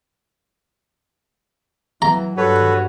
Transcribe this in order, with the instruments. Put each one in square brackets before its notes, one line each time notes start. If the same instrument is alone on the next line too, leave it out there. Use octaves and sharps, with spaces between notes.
[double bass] E3 F#3 [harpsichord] A#5
[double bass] G2 [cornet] F#4 [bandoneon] A4 B4 C#5